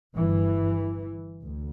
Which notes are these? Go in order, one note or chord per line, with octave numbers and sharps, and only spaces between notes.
G1 G2 E3
D2